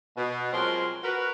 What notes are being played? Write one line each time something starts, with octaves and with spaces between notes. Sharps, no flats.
B2
F3 F#3 G#3 C4 A#4 C6
F#4 A#4 B4